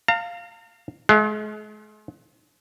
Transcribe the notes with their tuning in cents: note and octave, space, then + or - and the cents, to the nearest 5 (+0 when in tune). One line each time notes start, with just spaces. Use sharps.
F5 +0 A#5 -45
G#3 +40 F5 -20